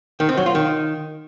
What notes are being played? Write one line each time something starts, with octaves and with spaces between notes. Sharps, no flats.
D#3
C4
F#3
F4
D#3